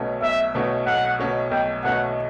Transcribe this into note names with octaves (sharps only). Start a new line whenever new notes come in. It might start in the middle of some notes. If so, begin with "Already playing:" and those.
Already playing: B1 B2 A3 C#4 F#4
B1 E5
B2 A3 C#4 F#4
B1 F#5
B2 A3 C#4 F#4
B1 G5
B2 A3 C#4 F#4 F#5